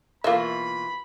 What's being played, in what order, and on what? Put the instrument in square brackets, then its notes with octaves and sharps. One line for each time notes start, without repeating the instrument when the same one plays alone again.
[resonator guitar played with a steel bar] B2 E3 F4 [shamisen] A#3 E5 [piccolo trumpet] B5